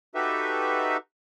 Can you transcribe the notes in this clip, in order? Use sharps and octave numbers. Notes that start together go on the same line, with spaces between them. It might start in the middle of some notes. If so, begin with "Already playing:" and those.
D#4 F#4 G4 A4 B4 E5